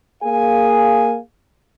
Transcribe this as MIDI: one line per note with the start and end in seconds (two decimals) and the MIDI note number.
0.23 1.17 58
0.23 1.17 68
0.23 1.17 77
0.23 1.17 80